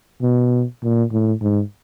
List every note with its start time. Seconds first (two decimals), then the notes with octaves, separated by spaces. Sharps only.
0.22 B2
0.83 A#2
1.12 A2
1.41 G#2